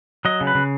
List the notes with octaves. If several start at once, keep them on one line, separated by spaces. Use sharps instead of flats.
F#3 D#5
C#3
B4
C#3